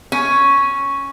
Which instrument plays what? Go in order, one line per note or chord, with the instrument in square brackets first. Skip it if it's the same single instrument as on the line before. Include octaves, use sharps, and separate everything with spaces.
[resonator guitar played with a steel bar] C#4